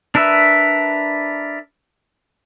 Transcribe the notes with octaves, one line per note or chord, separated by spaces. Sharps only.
D4 A#4 B4 E5